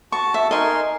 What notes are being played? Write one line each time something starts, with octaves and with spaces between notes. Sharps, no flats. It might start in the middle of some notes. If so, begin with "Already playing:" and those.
F#4 A5 C#6
E5
D#4 A#4 D#5 G#5 C6